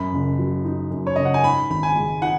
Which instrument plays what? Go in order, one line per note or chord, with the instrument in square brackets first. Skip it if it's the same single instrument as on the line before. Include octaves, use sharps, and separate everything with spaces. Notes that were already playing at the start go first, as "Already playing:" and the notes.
Already playing: [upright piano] F#2 [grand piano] B5
[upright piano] F#1
F#3
D#4
F#2
[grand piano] C#5
[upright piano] F#1 [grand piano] D#5
[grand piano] F#5
G#5
[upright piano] G#2 [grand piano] B5
[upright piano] G#1 [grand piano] B5
[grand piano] G#5
[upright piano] G#3
[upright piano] D#4 [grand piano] F#5